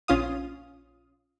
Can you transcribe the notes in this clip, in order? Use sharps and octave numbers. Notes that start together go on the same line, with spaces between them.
A#1 C#4 F4 F5 D#6